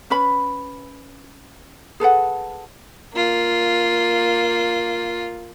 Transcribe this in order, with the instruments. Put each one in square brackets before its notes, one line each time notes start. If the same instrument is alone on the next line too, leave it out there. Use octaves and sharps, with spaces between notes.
[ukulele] C#4 B4 B5
G#4 A4 B4 F#5
[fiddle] A#3 F4